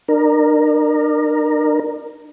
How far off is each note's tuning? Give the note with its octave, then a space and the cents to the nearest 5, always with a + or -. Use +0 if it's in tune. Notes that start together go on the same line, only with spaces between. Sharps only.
D4 +40 A#4 +0